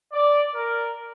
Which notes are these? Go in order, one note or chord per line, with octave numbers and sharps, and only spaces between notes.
D5
A#4